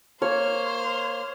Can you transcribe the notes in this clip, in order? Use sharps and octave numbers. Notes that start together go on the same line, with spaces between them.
A#3 C5 C#5 F6